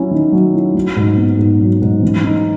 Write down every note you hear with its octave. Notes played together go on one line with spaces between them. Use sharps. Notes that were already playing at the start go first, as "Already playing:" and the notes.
Already playing: F#3 C#4 E4
D#3
F#3
E4
F#3
G#2
B3
G#2
F#3
G#2
E3
D#4